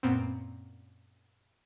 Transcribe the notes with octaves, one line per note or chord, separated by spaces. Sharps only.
F#2 A#2 B3 C4